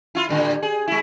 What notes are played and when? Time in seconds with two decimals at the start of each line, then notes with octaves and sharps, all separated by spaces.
0.15 E4 F4
0.29 A2 D3 G3
0.63 G#4
0.88 G#3 E4